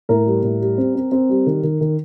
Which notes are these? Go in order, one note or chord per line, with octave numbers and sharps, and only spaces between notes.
A2 A#4
G3
A2
G3
C4
C4
C4
G3
D#3
D#3
D#3